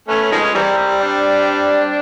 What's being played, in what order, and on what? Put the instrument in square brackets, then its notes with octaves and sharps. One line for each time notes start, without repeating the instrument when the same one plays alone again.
[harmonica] A3 [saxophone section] B3 C#4
[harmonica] D#3 F3 G#3
[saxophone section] C#4
[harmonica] E3 G3 [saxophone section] A#3 C4
[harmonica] G3
[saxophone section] C4 D4